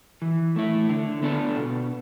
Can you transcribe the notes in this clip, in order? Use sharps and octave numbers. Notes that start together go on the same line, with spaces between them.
E3
A3 E4
D3
B3 D4 A4
B2